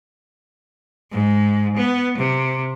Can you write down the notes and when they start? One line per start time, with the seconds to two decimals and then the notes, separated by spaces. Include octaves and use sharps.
1.12 G#2
1.77 B3
2.18 C3